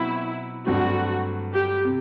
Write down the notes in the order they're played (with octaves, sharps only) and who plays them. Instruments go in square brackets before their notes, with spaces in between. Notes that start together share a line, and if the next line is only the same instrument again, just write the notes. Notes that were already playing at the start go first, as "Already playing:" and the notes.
Already playing: [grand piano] B2 F#3 C4 [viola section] E4
[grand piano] G2 D3 F#3 A3 C4 [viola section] F#4
[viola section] G4
[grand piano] C3